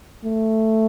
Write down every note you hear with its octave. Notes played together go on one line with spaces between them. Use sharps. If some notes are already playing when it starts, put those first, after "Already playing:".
A3